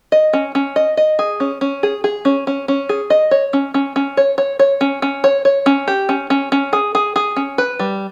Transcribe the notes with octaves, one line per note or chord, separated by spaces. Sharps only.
D#5
C#4
C#4
D#5
D#5
G#4
C#4
C#4
G#4
G#4
C#4
C#4
C#4
G#4
D#5
C#5
C#4
C#4
C#4
C#5
C#5
C#5
C#4
C#4
C#5
C#5
C#4
G4
C#4
C#4
C#4
G#4
G#4
G#4
C#4
B4
G3